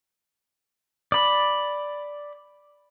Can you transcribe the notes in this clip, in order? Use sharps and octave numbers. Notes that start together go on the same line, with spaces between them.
D5 B5